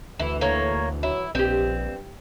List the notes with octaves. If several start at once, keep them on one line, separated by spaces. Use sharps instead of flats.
D2 E3 E4
A2 A#3 C#5
F#3 E4
A#1 G2 C4 G4 D#5